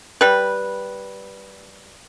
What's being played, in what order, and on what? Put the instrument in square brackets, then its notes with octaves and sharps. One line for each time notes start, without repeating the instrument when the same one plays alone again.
[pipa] G3 B4